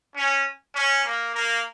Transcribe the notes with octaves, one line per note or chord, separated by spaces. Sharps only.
C#4
C#4
A#3
A#3